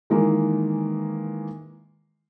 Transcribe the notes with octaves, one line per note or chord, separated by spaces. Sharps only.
D#3 E3 G#3 A#3